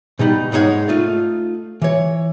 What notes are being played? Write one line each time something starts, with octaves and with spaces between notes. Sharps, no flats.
B2 G3 D#4 B5
G#2 G#3 D#4 F4 C#5 F#5
A3 D#4 F4
E3 C#5